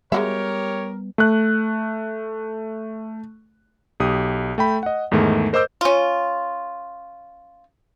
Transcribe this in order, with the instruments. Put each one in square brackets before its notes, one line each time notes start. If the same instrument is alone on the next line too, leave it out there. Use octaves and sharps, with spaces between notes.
[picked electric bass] G3 B3 [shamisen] G#3 F#4 E5 [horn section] G4 A#4 [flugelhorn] C#5
[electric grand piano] A3 F#6
B1 G4 D#6
A3 G5 B5
D#5 F#5
E2 G#2 D#3 A3
A#4 C5 D#5 D6 E6 G6
[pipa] C#4 F4